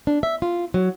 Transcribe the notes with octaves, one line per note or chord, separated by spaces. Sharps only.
D4
E5
F4
F#3